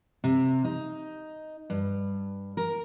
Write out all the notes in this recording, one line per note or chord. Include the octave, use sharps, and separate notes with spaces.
C3
D#4
G2
A#4